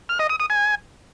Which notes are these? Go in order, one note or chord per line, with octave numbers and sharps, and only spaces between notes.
F6
D#5
D#6
D#6
G#5